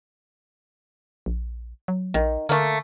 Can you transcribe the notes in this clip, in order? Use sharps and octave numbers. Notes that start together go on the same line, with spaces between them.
A#1
F#3
A#1 D#3
D3 A3 A#3